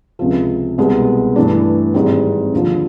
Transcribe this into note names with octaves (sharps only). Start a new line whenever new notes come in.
C#2 C3 F3
C2 B2 G#3 B3
G2 E3 A3 D4
G#1 G#2 E3 G3 C4
D#2 D3 F3